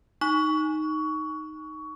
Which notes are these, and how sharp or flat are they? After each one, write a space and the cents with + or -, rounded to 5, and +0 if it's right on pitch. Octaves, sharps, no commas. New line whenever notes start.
D#4 +0 C#6 +20